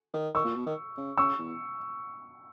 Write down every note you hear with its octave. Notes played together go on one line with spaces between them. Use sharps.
D#3
D#3 C#6 E6
A#2
B2
D#3
C#3
C#3 C#6 E6
E2